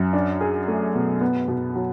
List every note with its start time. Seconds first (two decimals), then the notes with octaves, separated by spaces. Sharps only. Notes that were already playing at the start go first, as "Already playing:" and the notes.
Already playing: F#2
0.13 D4
0.41 G#4
0.68 A3
0.95 B2
1.21 B3
1.48 B2
1.75 F#3